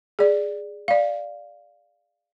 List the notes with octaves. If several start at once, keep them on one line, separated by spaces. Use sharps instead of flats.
G#4 D5
D5 F5